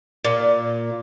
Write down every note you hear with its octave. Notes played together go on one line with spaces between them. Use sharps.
A#2